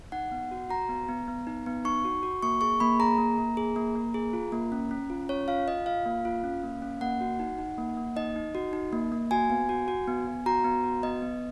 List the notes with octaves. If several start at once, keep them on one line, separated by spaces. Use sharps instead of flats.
D#4 F#5
B3
F#4
F#4 A#5
B3
B3
B3
D#4
B3
D#4 C#6
F#4
F#4
A#3 C#6
G#4 C#6
A#3 B5
G#4 A#5
A#3
A#3
G#4
A#3
A#3
G#4
F4
A#3
C#4
C#4
F4
C#4 C#5
F4 F5
F4 D#5
F4 F5
A#3
F4
C#4
A#3
C#4
A#3 F#5
F#4
D#4
D#4
A#3
A#3
D#4 D#5
D#4
F#4
D#4
A#3
A#3
F#4 G#5
B3
F#4
F#4
B3
B3
F#4 A#5
B3
F#4
B3 D#5
B3